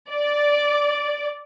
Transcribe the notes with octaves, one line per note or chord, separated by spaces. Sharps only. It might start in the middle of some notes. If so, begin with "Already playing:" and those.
D5